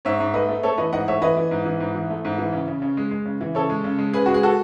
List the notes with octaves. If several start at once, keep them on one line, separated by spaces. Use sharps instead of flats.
G#2 C#5 E5
G#2
A3 B4 D#5
A3
A3 A4 C#5
E3 B4 D#5
G#2 D#5 F#5
A3 C#5 E5
E3 B4 D#5
E3
G#2
E3
G#2
E3
A3
G#2
E3
C#3
C#3
C#3
G#3
G#3
C#3
E3
C#3 A4 C#5
G#3
C#3
G#3
C#3 G#4 B4
G#3 F#4
G#4
F#4 A4